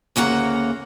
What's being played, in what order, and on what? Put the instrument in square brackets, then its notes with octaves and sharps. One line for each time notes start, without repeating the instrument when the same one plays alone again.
[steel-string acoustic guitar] D2 C#3 A#3 F#5 A#5